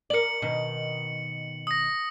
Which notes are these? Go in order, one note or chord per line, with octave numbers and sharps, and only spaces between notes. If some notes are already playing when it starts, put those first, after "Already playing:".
A#4 D5 C#7 F#7
B2 D#3
D#6 A#6